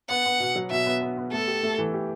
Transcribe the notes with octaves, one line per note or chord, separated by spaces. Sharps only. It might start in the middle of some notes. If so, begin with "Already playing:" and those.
B3 F#5
B3
B2
F#3
B2 E5
B3
B3
B3
A3 A4
G4
A3
E3
G4